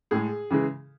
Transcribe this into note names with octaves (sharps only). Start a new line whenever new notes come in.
A2 G#3 G#4
C#3 E3 G#3